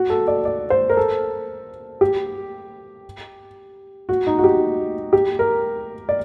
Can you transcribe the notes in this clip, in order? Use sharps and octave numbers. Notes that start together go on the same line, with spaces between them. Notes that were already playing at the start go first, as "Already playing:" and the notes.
Already playing: F#4
A4
D5
D5
C5
A#4
A4
G4
F#4
D#4
F#4
G4
G4
A#4
D5